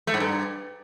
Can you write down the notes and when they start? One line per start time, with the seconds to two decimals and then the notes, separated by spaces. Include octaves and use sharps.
0.07 A3
0.14 G#2
0.20 G2